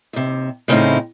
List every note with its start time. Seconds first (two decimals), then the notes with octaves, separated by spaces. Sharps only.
0.13 D#2 C3
0.68 A2 C#3 C4 C#4 D#4 E4